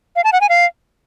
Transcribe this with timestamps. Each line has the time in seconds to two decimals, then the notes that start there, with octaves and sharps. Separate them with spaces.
0.16 F5
0.24 A5
0.33 F#5
0.41 G#5
0.49 F5